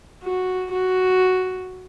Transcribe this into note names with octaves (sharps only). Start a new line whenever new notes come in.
F#4
F#4